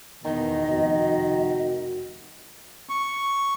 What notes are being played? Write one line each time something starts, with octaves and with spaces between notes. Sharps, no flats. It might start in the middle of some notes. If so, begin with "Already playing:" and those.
E2 B2 D#3 D#5
F1 F#4
C#6